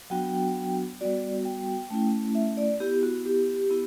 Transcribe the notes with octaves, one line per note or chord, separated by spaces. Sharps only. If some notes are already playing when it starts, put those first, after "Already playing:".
F#3 B3 D4 F#4 G5
G3 B3 F#4 D5
G5
A3 C#4 E4
E5
D5
B3 E4 G4
F#4
G4
B3 E4